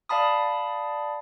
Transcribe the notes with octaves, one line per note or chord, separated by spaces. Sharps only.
D5 F5 A5 B5 D#6